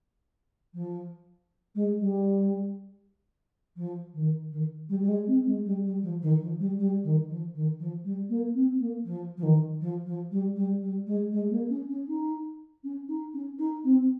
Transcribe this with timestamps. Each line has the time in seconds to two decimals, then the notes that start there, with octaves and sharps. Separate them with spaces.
0.73 F3
1.75 G#3
1.99 G3
3.76 F3
4.13 D#3
4.51 D#3
4.89 G3
5.01 G3
5.08 G#3
5.27 C4
5.46 G#3
5.65 G3
5.84 G3
6.02 F3
6.21 D#3
6.41 F3
6.59 G3
6.78 G3
7.03 D#3
7.29 F3
7.54 D#3
7.79 F3
8.04 G3
8.29 A#3
8.54 C4
8.80 A#3
9.05 F3
9.37 F3
9.42 D#3
9.80 F3
10.06 F3
10.31 G3
10.55 G3
10.81 G3
11.06 G#3
11.32 G#3
11.50 A#3
11.69 C#4
11.88 C#4
12.07 D#4
12.83 C#4
13.08 D#4
13.33 C#4
13.58 D#4
13.84 C4